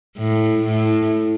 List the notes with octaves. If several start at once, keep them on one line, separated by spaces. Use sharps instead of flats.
A2
A2